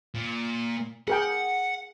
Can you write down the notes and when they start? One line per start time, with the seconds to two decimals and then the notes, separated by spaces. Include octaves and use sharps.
0.15 A#2
1.08 G#4 A#4 F#5 G5